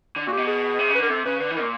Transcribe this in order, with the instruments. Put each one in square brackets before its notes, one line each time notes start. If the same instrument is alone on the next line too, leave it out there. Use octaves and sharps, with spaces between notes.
[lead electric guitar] D3
[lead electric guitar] A#2 [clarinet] F#4
[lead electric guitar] B2 [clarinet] G4
[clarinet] G#4
[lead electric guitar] C3
C#3
[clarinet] B4
[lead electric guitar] D3 [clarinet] A#4
[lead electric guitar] C3 [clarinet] A4
[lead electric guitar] C#3 [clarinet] B4
[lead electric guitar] D3 [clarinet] B4
[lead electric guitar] E3
[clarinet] A#4
[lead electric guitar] A#2